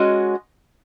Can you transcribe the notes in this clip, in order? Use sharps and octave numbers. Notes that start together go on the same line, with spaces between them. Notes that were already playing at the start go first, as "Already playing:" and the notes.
Already playing: G#3 C#4 F#4 D#5